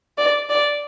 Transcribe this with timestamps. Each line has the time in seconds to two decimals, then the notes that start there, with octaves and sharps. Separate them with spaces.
0.18 D5
0.50 D5